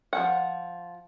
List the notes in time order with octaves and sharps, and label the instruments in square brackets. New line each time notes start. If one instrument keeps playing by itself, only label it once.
[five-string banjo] F3 C#4 F#5